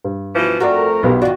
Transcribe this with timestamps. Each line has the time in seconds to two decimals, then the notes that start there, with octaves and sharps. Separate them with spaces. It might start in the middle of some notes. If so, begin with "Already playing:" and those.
0.04 G2
0.35 B2 E3 F3
0.60 F2 A3 C4 D4 F#4 A#4 D5
1.03 B1 B3 F4 G4 B5
1.22 D#3 D4 D#4 F4 F#4 D5